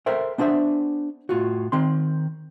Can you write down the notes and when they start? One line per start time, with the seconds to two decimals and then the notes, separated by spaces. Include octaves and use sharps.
0.06 A4 A#4 C5 E5 G5
0.38 B3 D4 G#4 C5 E5
1.29 A2 F4 F#4
1.72 D#3 C4 C6